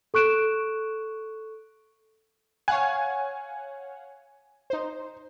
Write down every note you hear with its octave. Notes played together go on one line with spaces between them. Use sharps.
A4 C#6 F#6 D7 E7
C#5 F5 F#5 G#5
D#4 C5